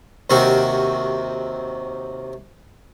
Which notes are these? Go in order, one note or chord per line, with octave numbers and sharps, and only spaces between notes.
D#2 C3 D#3 C4 F#4